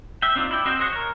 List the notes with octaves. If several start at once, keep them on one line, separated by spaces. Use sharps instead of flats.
E5 G5
C4 D4 D#4 F4
E4 D5 G5
C4 F#4 C5 D#5 G5
G#4 C5 C#5 D#5 F#5
A#4 C#5